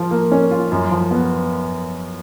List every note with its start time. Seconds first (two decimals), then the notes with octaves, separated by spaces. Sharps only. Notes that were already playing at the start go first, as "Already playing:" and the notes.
Already playing: F3 F4
0.11 A#3
0.32 C#4
0.51 F4
0.72 F#2
0.91 F3
1.11 B3